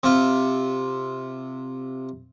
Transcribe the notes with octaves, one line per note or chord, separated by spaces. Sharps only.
C3 F4